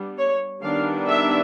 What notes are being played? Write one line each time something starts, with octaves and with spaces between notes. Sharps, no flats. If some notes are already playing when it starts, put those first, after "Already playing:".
Already playing: G3 B3 D4
C#5
D#3 G3 B3 D4 F5
E5